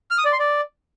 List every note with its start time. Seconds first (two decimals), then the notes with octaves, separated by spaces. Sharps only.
0.11 F6
0.18 D#6
0.25 D5
0.32 C6
0.39 D5